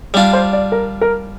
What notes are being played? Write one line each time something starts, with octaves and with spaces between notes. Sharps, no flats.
G3 D4 F4 D5
C5
D5
A#4
A#4